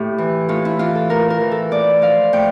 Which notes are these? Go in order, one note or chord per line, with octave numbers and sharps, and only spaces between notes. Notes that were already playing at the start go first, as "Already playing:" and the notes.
Already playing: A2 G4
E3
A2 F4
E4
E3 F4
A4
A2 A#4
A#4
E3
A4
A2 D5
F3 F5
A2 G5